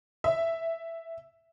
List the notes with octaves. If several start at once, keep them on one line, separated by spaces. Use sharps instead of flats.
E5